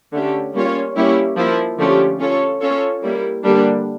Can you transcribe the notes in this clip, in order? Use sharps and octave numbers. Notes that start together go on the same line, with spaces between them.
D3 A3 C#4 G4
G3 A#3 C#4 F4 C#5
G3 A#3 C#4 E4 G4
F3 A#3 E4
D3 F3 A3 C#4 G4
C#4 F4 A4 C#5
C#4 F4 A4 C#5
G3 A#3 E4
D3 G3 A#3 D4